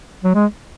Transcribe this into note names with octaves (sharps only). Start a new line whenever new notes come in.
F#3
G#3